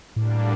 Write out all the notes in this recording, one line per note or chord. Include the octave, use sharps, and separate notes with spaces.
A2 D3 G3 A#3 D4